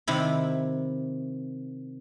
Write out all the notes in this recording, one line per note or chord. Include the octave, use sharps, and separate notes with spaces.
C3 D#3 E4